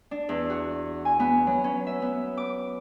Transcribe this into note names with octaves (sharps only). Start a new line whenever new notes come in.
D4
E2
F#4
G#5
B3
F#3
C#4
E5
B3
D6